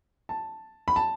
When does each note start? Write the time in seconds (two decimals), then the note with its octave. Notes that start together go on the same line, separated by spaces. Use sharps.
0.29 A5
0.88 B5
0.96 A5